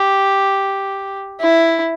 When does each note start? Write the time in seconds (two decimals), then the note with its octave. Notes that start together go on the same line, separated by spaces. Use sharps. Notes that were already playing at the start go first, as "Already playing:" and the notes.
Already playing: G4
1.41 E4